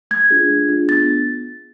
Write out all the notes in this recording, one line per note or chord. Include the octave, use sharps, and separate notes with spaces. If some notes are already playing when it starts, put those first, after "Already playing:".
A3 G#6
D4 F4 G#4
A3
D4 F4 G#4
B3 A6